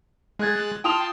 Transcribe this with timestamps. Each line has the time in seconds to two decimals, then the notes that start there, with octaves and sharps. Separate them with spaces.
0.39 G#3 G#4 F#6 G#6 A6
0.84 F4 G5 A5 C6 D#6 F7